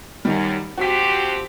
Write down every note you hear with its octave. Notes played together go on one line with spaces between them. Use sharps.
F#2 D#3 G3
F3 C4 F#4 G4 B6